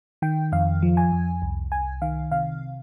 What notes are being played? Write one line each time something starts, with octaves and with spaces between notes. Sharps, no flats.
D#3 G5
F2 F5
F3
G#5
F2
C2
C2 G#5
D#3 F5
C3 F5